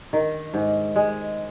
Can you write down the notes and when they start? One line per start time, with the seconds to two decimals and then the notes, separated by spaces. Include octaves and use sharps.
0.13 D#3
0.54 G#2
0.96 G#3